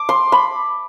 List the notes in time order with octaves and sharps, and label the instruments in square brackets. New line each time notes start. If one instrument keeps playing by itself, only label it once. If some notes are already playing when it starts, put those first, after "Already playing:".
Already playing: [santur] D6
C6
B5